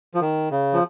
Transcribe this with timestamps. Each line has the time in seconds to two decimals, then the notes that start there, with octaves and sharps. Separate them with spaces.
0.14 F3
0.21 D#3
0.51 C#3
0.73 F3